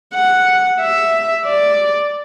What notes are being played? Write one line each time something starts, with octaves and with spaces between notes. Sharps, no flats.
F#5
E5
D5